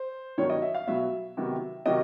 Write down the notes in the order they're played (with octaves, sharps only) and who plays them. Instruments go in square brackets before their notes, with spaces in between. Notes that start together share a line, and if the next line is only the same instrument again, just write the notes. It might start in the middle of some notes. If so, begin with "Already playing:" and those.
Already playing: [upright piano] C5
G2 D#3 F#3 B3 C#5
D#5
E5
F5
B2 F#3 B3 E5
C3 D#3 F#3 B3
C3 D#3 F#3 D#5